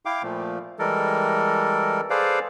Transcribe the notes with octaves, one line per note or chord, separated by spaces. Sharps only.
E4 F5 G5 D6
A#2 F3 A3
E3 G3 G#3 A4 A#4
G#4 A4 B4 C5 D5 F5